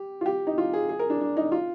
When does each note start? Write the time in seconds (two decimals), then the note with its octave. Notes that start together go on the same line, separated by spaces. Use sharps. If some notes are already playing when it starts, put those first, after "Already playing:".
Already playing: G4
0.21 F4
0.26 G4
0.47 D#4
0.58 F4
0.73 G#4
0.89 G#4
0.99 A#4
1.10 D4
1.21 D4
1.37 D#4
1.52 F4